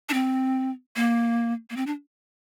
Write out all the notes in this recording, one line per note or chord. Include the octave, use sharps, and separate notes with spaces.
D4
C4
A#3
A#3
C4
D4